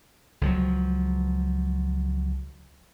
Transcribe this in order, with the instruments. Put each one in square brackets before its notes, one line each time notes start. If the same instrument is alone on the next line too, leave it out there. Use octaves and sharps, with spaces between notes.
[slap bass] C#2 F3 F#3